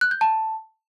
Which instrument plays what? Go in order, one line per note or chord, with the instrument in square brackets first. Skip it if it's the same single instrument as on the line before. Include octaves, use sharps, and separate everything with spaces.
[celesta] F#6
G6
A5